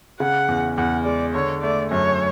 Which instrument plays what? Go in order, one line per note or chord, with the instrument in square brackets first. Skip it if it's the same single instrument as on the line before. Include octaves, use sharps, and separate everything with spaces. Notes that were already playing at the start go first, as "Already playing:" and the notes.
[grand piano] C#3 [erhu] F#5
[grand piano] E2
[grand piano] E2 [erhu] F#5
[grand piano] G#3 [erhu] D5
[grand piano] D3 [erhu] C#5
[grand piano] A3 [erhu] D5
[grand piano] F#2 [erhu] C#5